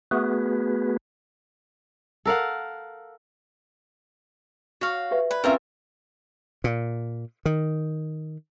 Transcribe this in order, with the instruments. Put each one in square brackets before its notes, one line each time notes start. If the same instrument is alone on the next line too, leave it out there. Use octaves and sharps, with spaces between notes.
[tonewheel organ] A3 B3 F#4 G#4 B4
[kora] A4 A#4 F5 F#5
[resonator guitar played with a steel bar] F#4 [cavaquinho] C#5 F5
[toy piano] G4 B4 E5
[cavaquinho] B4 [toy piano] D5
[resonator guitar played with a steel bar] C4 C#4 F4 [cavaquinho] A#4 E5 [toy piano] B4 F5
[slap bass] A#2
D#3